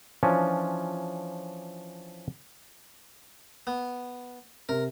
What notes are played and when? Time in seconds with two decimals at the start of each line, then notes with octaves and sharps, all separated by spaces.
0.23 E3 F3 C#4 D4
3.67 B3
4.69 C3 A#4